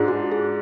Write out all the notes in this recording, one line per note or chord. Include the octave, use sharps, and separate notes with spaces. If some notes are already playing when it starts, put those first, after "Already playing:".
Already playing: G#2 G#3 D4 F4
F#4
G#4